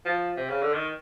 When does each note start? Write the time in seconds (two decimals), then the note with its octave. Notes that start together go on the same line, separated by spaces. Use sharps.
0.05 F3
0.37 C3
0.49 C#3
0.62 D3
0.74 D#3